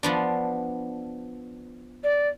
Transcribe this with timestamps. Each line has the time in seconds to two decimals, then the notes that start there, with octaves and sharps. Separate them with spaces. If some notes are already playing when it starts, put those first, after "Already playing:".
0.03 F3 B3 D4
2.04 D5